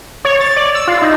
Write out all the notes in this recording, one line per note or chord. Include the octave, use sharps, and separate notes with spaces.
C#5
A6
D5
E6
F4
D#4